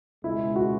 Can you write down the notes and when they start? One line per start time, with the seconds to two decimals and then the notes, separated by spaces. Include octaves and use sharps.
0.24 C#2 B2 G#3 E4
0.56 F#4